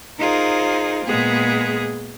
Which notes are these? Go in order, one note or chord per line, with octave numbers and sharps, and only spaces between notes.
D#4 F4 G#4 A#4 C5
A#2 G#3 B3 G#4